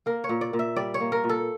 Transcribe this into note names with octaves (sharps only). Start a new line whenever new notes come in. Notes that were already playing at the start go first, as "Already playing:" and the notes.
A#3 A#4
C#5
A#2
D5
A#2
E5
G3 D5
C#5
A#3
A#4
A#2
A4